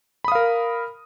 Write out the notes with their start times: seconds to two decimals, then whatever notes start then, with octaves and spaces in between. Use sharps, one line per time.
0.24 B5
0.28 D#6
0.32 F5
0.35 A#4